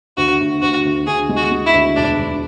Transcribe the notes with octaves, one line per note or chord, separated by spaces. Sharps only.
D2 F#4
D2
D2 F#4
D2
D2 G#4
G#3
F#4
G#3
E4
D2
E1 D4
E1